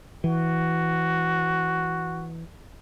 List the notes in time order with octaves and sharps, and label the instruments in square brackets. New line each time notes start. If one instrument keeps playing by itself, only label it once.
[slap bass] E3 [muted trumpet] F#4